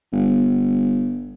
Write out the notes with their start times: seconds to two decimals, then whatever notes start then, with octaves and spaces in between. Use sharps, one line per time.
0.13 G1